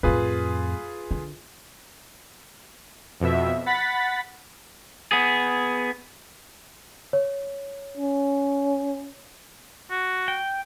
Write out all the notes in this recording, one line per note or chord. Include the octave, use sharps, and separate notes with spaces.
F2 A2 F4 G#4 B4
D3
F2 B2 E5
F#5 B5 A6 B6
B3 G#4
C#5
C#4
F#4
G5